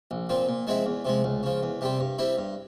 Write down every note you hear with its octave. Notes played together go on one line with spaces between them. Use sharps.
A#1
A#2 F3 C4
A#2
F3 G#3 C4 E4
E2
C3 F3 G#3
C#2
C#3 F3
E2
C3 G3 C4
G2
G3 C4 E4
G2